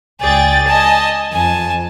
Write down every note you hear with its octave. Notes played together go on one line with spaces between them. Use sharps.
C#2 G#4 D5 G5 A6
D#5 G#5 A5
F2 G#5 A5